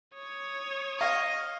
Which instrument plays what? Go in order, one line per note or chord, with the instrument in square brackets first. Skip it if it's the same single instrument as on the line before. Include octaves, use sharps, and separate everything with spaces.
[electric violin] C#5 D#6
[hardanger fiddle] D#5 [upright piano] F5 C#6